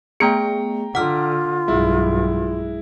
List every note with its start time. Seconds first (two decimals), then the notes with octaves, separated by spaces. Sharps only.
0.20 A3 B3 G#4 G5 A#5 C#7
0.95 D3 F4 F#5 F6
1.68 B1 G2 G#3 E4